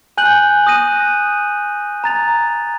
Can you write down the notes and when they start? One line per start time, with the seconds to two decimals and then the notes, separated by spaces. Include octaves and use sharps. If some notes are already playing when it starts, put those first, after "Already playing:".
0.18 G#5 F#6 G6 F#7
0.67 D#6 F#6 A#6 D#7
2.04 A#5 A6 F7